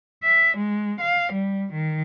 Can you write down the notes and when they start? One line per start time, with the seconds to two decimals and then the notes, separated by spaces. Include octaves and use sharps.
0.23 E5
0.57 G#3
1.01 F5
1.33 G3
1.73 D#3